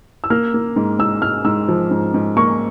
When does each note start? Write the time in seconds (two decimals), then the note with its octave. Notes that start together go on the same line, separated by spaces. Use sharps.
0.24 E6
0.30 A#3 F6
0.54 A#3
0.76 G#2
0.99 G#2 E6
1.22 G#2 F6
1.45 G#2 E6
1.68 F3
1.91 G#2
2.14 G#2
2.37 A#3 C#6